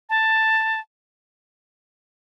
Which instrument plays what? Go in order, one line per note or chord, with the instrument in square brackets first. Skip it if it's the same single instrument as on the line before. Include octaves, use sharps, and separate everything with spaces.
[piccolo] A5